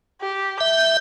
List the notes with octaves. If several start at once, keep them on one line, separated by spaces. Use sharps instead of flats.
G4
E5 G6